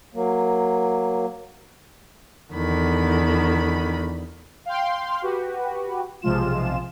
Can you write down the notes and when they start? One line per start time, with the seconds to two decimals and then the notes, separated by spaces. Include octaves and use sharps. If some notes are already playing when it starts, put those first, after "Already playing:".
0.14 F#3 A#3
2.53 E2 D3 D#3 B5
4.65 F5 G5 C6
5.22 F#4 G4 B4
6.22 B1 C3 F3 G#3 F4 E7